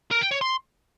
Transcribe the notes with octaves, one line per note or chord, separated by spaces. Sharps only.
A#4
G5
C#5
C6